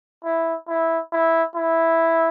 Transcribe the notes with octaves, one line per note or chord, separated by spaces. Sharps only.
E4
E4
E4
E4